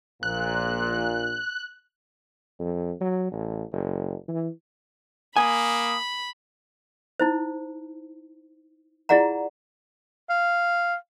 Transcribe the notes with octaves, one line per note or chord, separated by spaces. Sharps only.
A#1 A#2 F#6
F2
F#3
A1
F#1
E3
A#3 G#5 B5 D#6
D#4 E4 C5
E4 F4 G#4 D5 F#5 A#5
F5